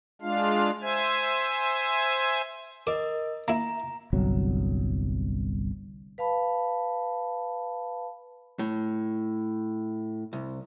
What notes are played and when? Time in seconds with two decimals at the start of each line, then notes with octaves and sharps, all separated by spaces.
0.22 G#3 D4 F4 F5
0.82 C5 E5 G#5 G#6
2.87 A#4 D#5 D6
3.48 A#3 E4 A#5
4.13 G1 C2 F#3
6.18 B4 F5 A5 B5
8.59 A2
10.33 C2